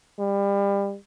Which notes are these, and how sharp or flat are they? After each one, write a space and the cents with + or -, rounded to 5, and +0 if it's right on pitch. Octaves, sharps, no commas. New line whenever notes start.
G3 +30